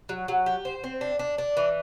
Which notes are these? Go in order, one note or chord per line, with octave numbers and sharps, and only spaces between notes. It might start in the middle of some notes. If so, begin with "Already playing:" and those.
F#3
F#3
G4
C5
C4
D4
D4
D4
E3